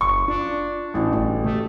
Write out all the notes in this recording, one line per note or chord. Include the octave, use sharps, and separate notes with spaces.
F#1 C#6
D4 F4
A1 A3 E4 F#4
G1 A3 F#4
C#3 A3 G4